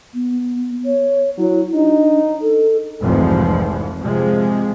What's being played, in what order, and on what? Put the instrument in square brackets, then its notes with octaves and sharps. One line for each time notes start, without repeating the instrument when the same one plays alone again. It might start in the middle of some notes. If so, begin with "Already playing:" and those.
[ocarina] B3
C#5
[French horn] F#3 [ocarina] E4
[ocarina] D4 [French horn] D#4
[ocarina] A4
[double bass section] F1 C2 G#2 C3 E3 F3
C3 F3 G#3